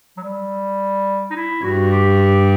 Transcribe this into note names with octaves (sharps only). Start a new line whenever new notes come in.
F#3
G3
D#4
E4
G2 F#4
G4